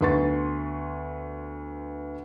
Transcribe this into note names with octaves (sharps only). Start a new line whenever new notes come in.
D2 B3 B4 C6 C#6 A6